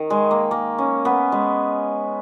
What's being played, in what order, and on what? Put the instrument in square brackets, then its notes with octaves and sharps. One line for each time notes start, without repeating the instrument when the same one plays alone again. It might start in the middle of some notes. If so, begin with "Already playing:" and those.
Already playing: [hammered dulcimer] D#3
G#3
A#3
A#3
C#4
B3
G#3